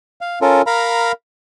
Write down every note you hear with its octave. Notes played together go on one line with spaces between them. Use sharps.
F5
C#4 F4 A4 A#4
A#4 F5 A#5 B5